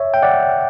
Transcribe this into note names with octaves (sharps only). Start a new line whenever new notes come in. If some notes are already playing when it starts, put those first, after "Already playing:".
Already playing: C#5 E5
G5
D5 F#5